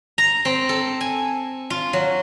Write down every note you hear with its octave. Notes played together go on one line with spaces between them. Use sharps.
A#5
C4
A4
G#5
F4
F#3